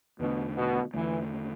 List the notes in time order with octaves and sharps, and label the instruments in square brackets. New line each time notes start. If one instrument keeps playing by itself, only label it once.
[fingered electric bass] E2 D3 A3 D4 [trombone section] B2
[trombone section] B2
[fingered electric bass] E2 D3 A3 [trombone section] E3